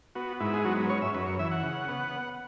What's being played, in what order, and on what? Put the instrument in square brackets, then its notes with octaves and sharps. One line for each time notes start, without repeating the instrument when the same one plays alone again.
[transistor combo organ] B3 F#4
G#2 E4
G#4
F#3 F#4
B4
C#4 C#5
E5
F#2 B4
C#5
E3 E5
F#5
C#3
B3